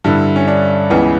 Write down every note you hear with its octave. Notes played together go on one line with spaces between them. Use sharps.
G2 D3 E4
C#4
D4
C#2 C#3 E3 B3